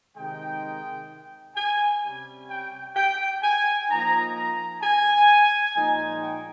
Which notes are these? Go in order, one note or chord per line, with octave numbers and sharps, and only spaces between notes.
C3 D#3 G#3 D#4 G5
G#5
C3 G3 C#4
G5
G5
G#5
F3 A#3 D#4 A#5
A#5
G#5
A#2 F3 G#3 D#4
G5